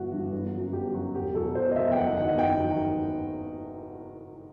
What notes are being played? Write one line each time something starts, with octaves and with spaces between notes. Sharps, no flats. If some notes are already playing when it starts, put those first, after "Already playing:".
Already playing: G1 G2 E3 E4 F#4
G2 E3
G1
F#2 F#3
G1 G4
F#2 F#3 F#4
E1 G4
E2 B2 F#3 A4
E1 C5
C5
D#5
E2 B2 F#3 E5
G5
F#1 F#5
D#5
E2 D#3 F#3 F#5
D#5
F#1 G5
D#3 F#3